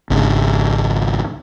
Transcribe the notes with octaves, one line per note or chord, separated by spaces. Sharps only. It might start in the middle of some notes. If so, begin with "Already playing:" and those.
G#1 C#2